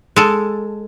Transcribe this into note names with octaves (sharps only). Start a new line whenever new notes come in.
G#3 A4